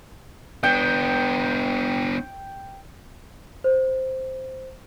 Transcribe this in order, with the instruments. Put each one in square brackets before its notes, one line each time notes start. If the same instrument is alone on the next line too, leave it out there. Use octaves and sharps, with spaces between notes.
[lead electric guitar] B3 D4 [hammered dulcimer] G5
[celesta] C5